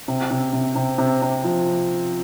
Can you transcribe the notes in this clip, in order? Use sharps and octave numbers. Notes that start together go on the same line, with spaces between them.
C3
C3
C3
C3
C3
C3
F3